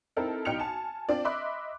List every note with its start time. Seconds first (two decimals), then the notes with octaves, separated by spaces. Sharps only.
0.17 C4 D#4 E4 A4 A#4
0.45 B1 D#4 G5 F6 C#7 F7
0.60 G#5 A5
1.09 C4 D4 F4 D5
1.25 D#5 E5 B5 C6 D6 F#6